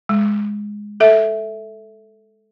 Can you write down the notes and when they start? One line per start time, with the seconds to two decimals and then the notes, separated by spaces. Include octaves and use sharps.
0.09 G#3
1.00 A4 E5